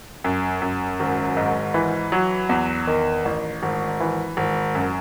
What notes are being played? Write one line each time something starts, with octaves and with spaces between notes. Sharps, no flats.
F#2
F#2
G#1
G#2
E3
F#3
E2
D#3
A1
G#1
E3
G#1
F#2